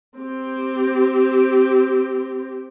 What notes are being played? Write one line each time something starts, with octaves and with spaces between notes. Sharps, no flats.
C4 G4